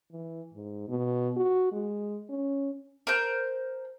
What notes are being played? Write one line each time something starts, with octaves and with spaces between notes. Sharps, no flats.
E3
G#2
B2
F#4
G#3
C#4
A#4 C5 G6